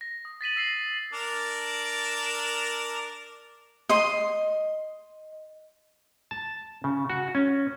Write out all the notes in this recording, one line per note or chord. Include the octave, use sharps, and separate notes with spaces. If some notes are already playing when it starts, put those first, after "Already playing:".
A#6
D#6
A6 B6 D#7 F#7
E6 A#6 C7 F#7
D4 A#4 D5
D#5 C6
A5
C#3
F#4
C#4